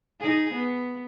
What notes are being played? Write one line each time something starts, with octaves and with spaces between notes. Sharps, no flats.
D#4 G#4
B3